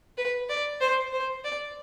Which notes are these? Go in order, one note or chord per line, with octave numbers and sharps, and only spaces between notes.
B4
D5
C5
C5
D5